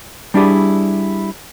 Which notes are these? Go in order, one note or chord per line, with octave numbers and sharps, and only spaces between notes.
G3 D4 E4 G4 G#4